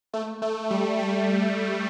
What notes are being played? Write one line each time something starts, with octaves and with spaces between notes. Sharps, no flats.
A3
A3
G3
A3